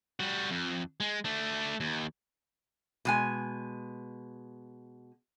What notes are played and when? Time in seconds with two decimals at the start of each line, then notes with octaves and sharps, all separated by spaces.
0.20 G3 F#4
0.51 F2
1.00 G#3
1.25 A3 D4
1.80 D#2
3.05 B2 G#3 G#5